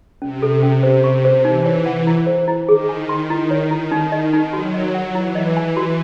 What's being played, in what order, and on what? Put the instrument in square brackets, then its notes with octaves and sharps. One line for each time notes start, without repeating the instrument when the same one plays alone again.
[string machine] C3 [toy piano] C#4
[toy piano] A4
C#4
C5
C#6
C5
[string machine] E3 [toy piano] D#4
[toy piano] C#5
F#5
E4
C5
E4
[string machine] D#3 [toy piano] G#4
[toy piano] G#5
C6
E4
C#5
E4
D#4
D#5
D#4
[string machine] F#3 [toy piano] F#4
[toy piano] D#5
F#5
[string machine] E3 [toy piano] E4
[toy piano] D#5
G#5
F#4